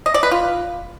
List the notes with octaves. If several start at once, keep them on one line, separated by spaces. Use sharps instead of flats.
D#5
D5
B4
F4